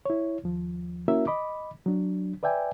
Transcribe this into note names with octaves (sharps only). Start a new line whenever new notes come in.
E4 C#5
D#2 F3
A#3 C#4 E4 F#4 A#4 E5
D#5 B5 D6
F#3 D4
B4 D5 E5 G5 G#5